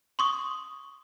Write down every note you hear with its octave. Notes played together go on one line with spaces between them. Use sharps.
C6 C#6 D#6